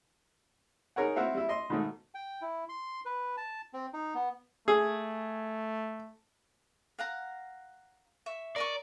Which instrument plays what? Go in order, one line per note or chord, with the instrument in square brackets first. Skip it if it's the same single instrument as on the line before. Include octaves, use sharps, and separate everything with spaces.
[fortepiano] D#4 G#4 A#4 C#5 F#5
C4 E4 F#4 F5
G3 E4
D#5 C6
G#2 B2 D#3 A3
[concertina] G5
E4
C6
B4
A5
C4
D#4
B3
[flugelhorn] A3 [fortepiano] G#4
[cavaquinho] F5 F#5 A#5
E5 C#6
[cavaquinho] A#4 D#5 C#6 [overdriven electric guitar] D5